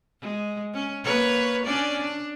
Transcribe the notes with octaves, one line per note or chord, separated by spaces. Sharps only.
G#3
C#4
A#3 B4 C#5
C#4 D4 D5
D4